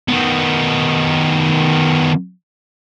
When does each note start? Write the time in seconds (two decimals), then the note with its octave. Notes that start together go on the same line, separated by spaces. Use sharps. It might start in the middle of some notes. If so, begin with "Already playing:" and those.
0.08 D#3 B3